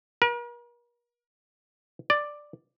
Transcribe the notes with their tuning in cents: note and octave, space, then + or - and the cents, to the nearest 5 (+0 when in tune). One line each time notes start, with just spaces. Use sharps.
A#4 +45
D5 +5